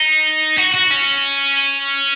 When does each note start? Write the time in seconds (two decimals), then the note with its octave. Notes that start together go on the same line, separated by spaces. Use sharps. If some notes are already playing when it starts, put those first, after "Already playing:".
Already playing: D#4
0.58 F#4
0.74 F#4
0.91 C#4